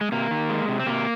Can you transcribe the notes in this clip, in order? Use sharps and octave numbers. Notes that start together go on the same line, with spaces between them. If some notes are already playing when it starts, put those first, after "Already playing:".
G#3
C3 A#3
D#3
G#3
C3
C4
C3 A#3